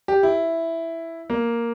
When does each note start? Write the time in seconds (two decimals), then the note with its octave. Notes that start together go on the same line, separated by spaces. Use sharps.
0.08 G4
0.23 E4
1.30 A#3